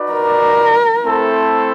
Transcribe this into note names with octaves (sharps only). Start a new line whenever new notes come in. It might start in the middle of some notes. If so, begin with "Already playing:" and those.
Already playing: D#4 F#4 B4 D5
A#4
A3 C4 E4 A4 C5